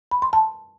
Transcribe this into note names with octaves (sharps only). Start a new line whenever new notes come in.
B5
C6
A5